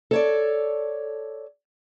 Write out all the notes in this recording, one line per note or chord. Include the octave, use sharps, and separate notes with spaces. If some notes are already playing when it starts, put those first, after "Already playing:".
A4 C#5 D5